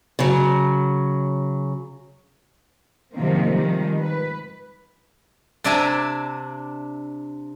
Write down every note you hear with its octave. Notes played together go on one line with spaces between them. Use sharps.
C#3 F#3
C3 D#3 F3 A#3 C4
D#3 F3 G3 G#3
B4
C3 D4 D5 E5 G#5 A#5